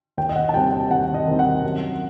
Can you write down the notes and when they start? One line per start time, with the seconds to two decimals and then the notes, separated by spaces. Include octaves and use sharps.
0.17 D#2 G5
0.29 D#5
0.36 F#5
0.49 A5
0.53 D#3 G3 C4 G5
0.72 G5
0.90 D#2 F#5
1.14 D#5
1.27 D#3 G3 C4
1.39 F#5
1.63 F#2